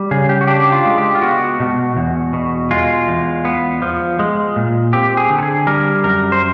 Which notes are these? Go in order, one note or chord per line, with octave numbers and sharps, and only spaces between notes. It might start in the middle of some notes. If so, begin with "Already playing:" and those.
Already playing: G3
C#3 G#4
G4
F#4
D4 G4
F4
G#3
G4
F4
B3 F#4
B2
E2
B2
G#3 F4
E2
B3
F3
G#3
A#2
C4 G4
G#4
D3
A4
G#4
G3 A#4
F#2 A#4
C5